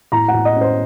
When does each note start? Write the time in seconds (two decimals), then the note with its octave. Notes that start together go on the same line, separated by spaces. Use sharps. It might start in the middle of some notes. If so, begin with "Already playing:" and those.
0.12 A2 A#5
0.28 F#5
0.34 A2
0.45 D#5
0.56 C#4
0.61 C5